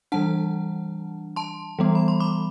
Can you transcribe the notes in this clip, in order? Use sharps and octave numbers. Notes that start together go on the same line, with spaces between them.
E3 G3 D4 F#5 A5
A5 C6
E3 G3 B3
B5
C6
B5 D6